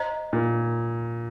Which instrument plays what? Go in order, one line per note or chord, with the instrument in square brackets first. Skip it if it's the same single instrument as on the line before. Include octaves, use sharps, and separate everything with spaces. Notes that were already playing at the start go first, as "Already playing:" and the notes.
Already playing: [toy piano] C5 D#5 A#5
[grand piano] A#2